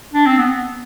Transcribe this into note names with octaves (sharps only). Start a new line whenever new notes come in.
D4
C4
B3